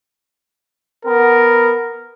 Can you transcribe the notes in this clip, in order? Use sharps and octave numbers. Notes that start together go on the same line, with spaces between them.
B3 A#4